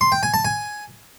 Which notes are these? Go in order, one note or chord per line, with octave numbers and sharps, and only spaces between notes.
C6
G5
G#5
A5
G#5